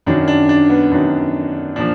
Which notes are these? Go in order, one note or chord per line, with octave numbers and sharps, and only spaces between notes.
F#2 D#3 F#3 D4
D4
D4
B3
F#2 D#3 F#3 D4
A#2 F3 D4